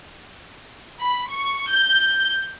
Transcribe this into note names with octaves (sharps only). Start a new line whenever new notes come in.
B5
C#6
G6